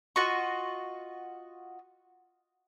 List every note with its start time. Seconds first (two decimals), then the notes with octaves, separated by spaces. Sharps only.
0.16 F4 F#4 D#5 C#6